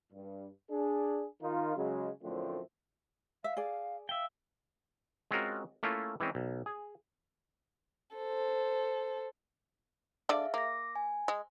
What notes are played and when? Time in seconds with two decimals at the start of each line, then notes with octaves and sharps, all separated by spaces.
0.13 G2
0.71 D4 G#4
1.42 D#3 D#4 F4
1.77 C#3 F#3 G#3
2.23 F#2 A2 D3 F3 A3 C4
3.44 E5 F5
3.57 G#4 D5
4.09 E5 F5 G5
5.31 G#3 C4 C#4 F4 F#4 A#4
5.83 A3 A#3 C#4 E4 F4
6.20 E3 G#3 C4 C#4
6.35 B1
6.66 G#4
8.16 A4 C5
10.29 D3 G#4 D5 E5 F5
10.54 A#3 D6 A#6
10.96 G#5
11.28 G#3